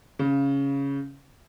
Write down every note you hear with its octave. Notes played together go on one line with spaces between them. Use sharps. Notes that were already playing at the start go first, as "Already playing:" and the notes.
C#3